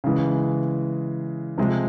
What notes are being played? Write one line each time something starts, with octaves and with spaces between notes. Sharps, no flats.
C#3 E3 G#3
C3 F3 G#3